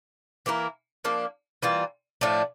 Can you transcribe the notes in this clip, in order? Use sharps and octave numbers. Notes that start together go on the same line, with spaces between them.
E3 A#3 E4 A#4
F3 A#3 D4
E3 G3 A#3 F4
A2 F3 A3 D4